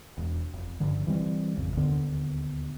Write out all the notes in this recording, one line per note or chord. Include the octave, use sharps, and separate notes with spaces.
E1
F1
F#1 G2 D3 F3
E3 G3 C4
G#1 F2 C#3
D#1 D2 D3 B3